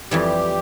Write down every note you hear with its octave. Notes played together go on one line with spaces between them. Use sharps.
F2 E3 G3 G4